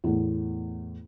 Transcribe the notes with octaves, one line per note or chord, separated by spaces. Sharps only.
E2 A2